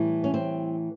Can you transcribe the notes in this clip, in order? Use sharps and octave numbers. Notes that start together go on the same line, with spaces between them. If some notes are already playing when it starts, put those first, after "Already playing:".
Already playing: A2 E3 G3
C#4
C4